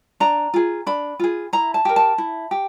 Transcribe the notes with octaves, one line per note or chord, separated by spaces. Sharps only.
D4 A#5
F4 G#4
D4 B5
F4 G#4
E4 A#5
A5
G4 A#4
A5
E4
G4